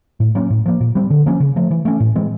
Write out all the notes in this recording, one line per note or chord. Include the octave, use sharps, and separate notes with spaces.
A2
F#3 A#3 C#4
A2
F3 A#3
A#2
G3 C4
D3
F3 A#3 C#4
C#3
F3 A3
E3
A3 C#4
A2
E3 G#3 C4